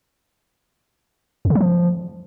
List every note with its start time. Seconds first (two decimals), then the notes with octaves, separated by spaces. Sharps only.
1.45 F2
1.50 C#3
1.55 F#3
1.60 F3